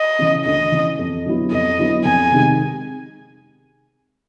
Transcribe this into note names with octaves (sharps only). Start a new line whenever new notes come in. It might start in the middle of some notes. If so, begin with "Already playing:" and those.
Already playing: D#5
C#3 E3
D2 D#5
C#3 E3
F2
D3 F#3 B3 E4
F2 D#5
D3 F#3 B3 E4
F2 G#5
C3 D#3 G#3